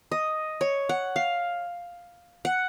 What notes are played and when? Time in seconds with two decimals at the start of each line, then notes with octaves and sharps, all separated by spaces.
0.12 D#5
0.61 C#5
0.89 F#5
1.16 F5
2.45 F#5